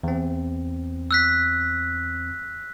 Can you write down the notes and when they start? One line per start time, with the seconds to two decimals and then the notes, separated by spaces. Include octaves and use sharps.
0.03 E2 C4
1.11 E6 F#6 B6